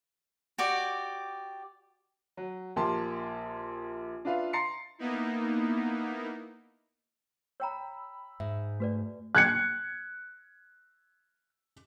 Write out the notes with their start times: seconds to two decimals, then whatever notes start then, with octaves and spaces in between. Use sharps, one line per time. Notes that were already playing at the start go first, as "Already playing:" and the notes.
0.58 F#4 G4 D5 D#5
2.37 F#3
2.76 A#1 A#3 G4 A5 C6
4.25 D4 F4 B4 E5 F5
4.53 A#5 C6 A6 C7 C#7
4.99 A#3 B3 D#4 E4
7.60 C#5 G5 A#5 B5 E6
8.40 G#2 E5
8.80 A3 F#4 B4 D5
9.35 F#6 G#6 C#7